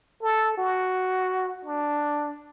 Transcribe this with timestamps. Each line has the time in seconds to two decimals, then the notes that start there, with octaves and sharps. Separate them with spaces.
0.22 A4
0.57 F#4
1.65 D4